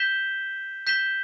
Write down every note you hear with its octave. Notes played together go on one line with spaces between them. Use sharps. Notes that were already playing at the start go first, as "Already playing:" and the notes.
Already playing: G6 B6 E7 G7
G6 B6 E7 G7